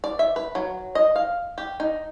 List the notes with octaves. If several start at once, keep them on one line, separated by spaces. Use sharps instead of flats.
D5
E5
B4
F#3
D#5
F5
G4
D#4